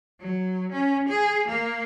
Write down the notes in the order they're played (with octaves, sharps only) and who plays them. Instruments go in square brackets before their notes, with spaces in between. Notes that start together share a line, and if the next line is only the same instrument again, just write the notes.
[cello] F#3
C#4
G#4
A#3